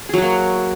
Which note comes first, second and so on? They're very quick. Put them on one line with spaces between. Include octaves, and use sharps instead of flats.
G#4 F#3 F#4 A#3